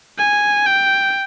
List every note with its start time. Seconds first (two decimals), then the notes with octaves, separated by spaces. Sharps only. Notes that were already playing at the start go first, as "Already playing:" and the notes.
0.18 G#5
0.66 G5